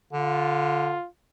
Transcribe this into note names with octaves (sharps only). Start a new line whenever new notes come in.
D3 F4